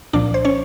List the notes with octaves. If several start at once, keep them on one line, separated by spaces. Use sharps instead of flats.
C2 A#2 F3 D4 D5
C5
C#4 C#5